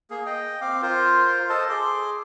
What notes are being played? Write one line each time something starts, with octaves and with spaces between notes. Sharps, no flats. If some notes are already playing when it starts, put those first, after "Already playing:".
A#3 G#4
D#5 G5
C4 F5 D6
F4 A#4 C5
A4 C5 D#5 A5
G#4 C6 D6